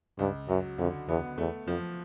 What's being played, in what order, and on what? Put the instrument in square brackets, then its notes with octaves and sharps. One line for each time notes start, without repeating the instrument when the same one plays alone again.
[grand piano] C#2 [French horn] G2
[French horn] F#2 [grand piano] F#3
[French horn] F2 [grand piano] D3
[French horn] E2 [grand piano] B3
[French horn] E2 [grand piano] A3
[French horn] F2 [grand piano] F3